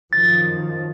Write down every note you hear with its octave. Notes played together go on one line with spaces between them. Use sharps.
F#2 D#3 F3 A6